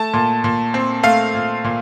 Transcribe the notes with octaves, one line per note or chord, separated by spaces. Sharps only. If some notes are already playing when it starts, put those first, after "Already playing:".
Already playing: A3 A5
A#2
A#2
C4
A3 F5
A#2
A#2